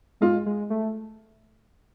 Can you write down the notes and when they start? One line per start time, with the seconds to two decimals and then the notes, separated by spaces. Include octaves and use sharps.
0.21 G#3 F4
0.46 G#3
0.70 A3